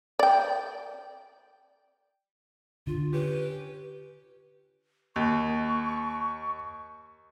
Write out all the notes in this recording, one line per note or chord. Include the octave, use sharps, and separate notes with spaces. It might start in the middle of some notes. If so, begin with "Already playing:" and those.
D5 G5
D3 F4
C#4 G4 B4
D#2 C#6